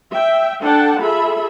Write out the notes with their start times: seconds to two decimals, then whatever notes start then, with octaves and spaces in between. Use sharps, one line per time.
0.11 E5 G5
0.61 D4 A4 F#5 G5 A5
1.00 F4 G#4 A4 E5 B5